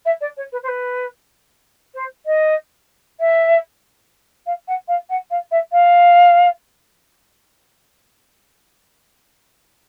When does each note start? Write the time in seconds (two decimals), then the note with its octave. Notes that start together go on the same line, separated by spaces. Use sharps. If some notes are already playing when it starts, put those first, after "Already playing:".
0.06 E5
0.21 D5
0.37 C#5
0.52 B4
0.63 C5
0.68 B4
1.95 C5
2.26 D#5
3.20 E5
4.46 F5
4.68 F#5
4.88 F5
5.10 F#5
5.31 F5
5.51 E5
5.72 F5